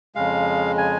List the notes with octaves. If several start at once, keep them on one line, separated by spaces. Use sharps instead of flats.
F2 C#3 G#3 F5
G#5